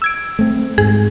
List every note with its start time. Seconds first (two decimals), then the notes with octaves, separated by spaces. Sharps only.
0.02 E6 G#6 D7
0.39 A3 C4
0.78 G#2 G#4